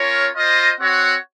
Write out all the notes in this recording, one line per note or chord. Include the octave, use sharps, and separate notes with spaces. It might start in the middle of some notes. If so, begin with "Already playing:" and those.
Already playing: C#4 F4 A#4 C#5
F4 C5 D#5
C4 F#4 C#5 F#5